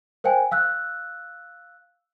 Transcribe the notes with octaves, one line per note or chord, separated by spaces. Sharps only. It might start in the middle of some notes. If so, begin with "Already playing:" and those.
A#4 C5 F5 G5 G#5
F5 E6 F#6